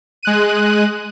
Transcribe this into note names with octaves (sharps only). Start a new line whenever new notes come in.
G#3 F#6 D#7